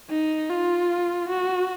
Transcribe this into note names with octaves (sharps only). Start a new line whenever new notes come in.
D#4
F4
F#4